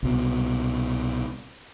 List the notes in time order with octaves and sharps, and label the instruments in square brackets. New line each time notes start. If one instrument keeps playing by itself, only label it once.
[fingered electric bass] C2 B2